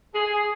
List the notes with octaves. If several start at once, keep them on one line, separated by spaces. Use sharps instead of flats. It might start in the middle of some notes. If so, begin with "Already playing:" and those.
G#4